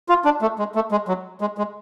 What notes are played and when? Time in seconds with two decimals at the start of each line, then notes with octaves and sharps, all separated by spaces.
0.09 F4
0.25 D4
0.42 A3
0.59 G#3
0.75 A3
0.91 G#3
1.08 F#3
1.41 G#3
1.58 G#3